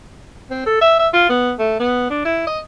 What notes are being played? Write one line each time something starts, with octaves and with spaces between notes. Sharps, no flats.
C4
A4
E5
E5
F4
B3
A3
B3
D4
E4
D#5